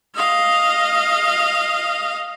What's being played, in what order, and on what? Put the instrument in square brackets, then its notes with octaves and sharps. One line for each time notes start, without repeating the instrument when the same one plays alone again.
[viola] D#5 F5